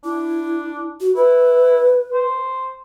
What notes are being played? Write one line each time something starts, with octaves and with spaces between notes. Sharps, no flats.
D4 E4
F#4
E4 B4
C5